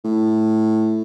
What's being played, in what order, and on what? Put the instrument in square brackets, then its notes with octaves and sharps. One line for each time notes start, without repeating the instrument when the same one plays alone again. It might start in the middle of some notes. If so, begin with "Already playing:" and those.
[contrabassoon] A2